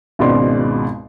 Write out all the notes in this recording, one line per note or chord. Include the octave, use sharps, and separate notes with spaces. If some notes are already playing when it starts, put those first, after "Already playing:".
G#1 C#2 B2 G#3 D5 C6